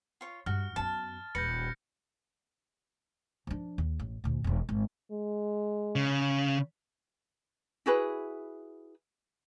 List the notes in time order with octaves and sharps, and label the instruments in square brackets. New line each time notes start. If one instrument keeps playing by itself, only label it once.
[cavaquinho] F4 C#5
[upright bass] G2 [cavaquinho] F#4 [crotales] F6
[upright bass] F#2 B3 [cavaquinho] A5 [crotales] A6
[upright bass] D#1 [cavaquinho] B4 [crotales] G6 A#6 C#7
[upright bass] F3 D4
D#2
A1
D2 A#2
E1 E3
G#1
[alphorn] G#3
[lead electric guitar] C#3
[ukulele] E4 F#4 G#4 B4